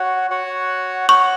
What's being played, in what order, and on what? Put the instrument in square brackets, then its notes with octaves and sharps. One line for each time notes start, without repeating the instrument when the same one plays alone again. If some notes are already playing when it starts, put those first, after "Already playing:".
Already playing: [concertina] F#4 C#5 F#5
F#4 C#5 F#5
[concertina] F#4 C#5 F#5 [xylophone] C#6